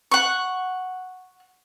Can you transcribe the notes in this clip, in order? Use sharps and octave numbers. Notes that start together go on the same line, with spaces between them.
F#5 C#6